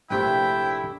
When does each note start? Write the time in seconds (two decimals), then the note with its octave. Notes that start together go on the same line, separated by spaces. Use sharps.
0.10 A#1 C3 A3 D4 E4 G4 B4 G5